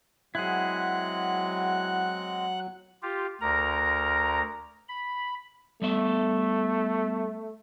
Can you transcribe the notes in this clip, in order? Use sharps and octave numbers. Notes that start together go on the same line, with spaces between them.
F#3 G#3 C4 E4 G#4 F#5 F#6
F4 G4
D2 A#4 A#5
B5
G3 A3 B3 E5